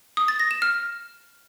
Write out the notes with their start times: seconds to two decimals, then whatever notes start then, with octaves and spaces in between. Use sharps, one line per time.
0.17 D#6
0.28 A6
0.40 A#6
0.51 E7
0.62 F6